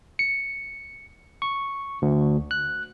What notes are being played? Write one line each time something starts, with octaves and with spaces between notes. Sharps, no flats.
C#7
C#6
D2
F#6